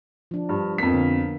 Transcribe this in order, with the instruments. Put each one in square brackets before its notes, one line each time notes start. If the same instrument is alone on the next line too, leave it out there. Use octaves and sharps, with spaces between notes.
[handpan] F3 D4
[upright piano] G2
[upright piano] F2 B6 [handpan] A#3 B3
[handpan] D3 F5